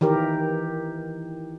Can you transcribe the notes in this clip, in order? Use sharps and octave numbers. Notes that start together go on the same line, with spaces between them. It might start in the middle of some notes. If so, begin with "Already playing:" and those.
D#3 E3 G4 A#4